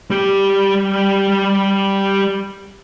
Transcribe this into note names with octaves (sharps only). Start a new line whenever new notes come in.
G3 G4